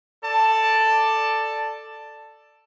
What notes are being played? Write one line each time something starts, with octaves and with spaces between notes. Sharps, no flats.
A4 D5 A5